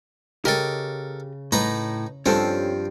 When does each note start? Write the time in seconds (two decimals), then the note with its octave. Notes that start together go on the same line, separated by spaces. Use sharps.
0.45 C#3 G4 A4 A#4 D#5
1.52 A2 D#4 B4 A#5
2.26 G2 F3 C4 C#4 A4